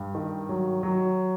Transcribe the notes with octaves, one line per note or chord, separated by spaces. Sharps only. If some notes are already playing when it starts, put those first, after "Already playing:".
Already playing: G2
D#3
F#3
F#3